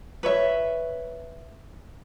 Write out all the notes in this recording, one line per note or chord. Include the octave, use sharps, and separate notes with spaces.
B4 C#5 E5